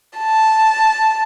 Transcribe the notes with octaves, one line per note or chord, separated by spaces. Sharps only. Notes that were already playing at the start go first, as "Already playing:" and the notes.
A5